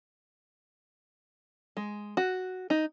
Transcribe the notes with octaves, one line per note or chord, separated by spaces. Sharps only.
G#3
F#4
D#4